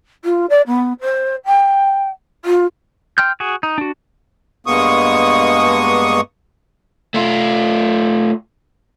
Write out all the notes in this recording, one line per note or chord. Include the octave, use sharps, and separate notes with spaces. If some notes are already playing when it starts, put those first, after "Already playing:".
F4
D5
B3
C5
G5
F4
G5 C6 F6 G6
F#4 G#4
D#4
D4 F#4
G2 G#3 A#3 B3 C#6 D#6
A3 F4